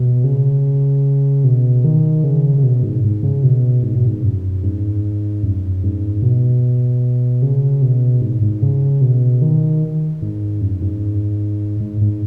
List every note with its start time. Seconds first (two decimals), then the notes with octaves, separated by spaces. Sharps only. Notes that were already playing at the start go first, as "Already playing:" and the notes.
Already playing: B2
0.24 C#3
1.44 B2
1.84 D#3
2.24 C#3
2.58 C#3
2.63 B2
2.83 G#2
3.04 G#2
3.23 C#3
3.43 B2
3.83 G#2
3.95 B2
4.06 G#2
4.23 F#2
4.63 G#2
5.43 F#2
5.83 G#2
6.22 B2
7.42 C#3
7.82 B2
8.21 G#2
8.42 G#2
8.62 C#3
9.01 B2
9.42 D#3
10.22 G#2
10.61 F#2
10.81 G#2
11.80 G#2
12.01 G#2